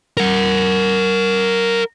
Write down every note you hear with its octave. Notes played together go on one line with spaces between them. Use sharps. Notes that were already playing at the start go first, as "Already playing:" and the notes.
A#4 F#5